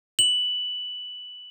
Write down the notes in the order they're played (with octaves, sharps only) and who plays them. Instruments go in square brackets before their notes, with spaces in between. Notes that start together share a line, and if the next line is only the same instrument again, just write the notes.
[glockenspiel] F#7